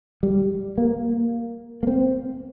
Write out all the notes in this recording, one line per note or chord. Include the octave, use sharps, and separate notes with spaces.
G3
A#3
A#3
C4